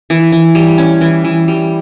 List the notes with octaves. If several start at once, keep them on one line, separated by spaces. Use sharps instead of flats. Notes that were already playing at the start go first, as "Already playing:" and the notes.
E3
E3
G3
C#4
E3
E3
G3